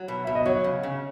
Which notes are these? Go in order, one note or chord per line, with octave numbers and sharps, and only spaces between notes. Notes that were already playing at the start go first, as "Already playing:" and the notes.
Already playing: F#3
B2
B2 E5
D#5
F#3 C#5
C#3
C#3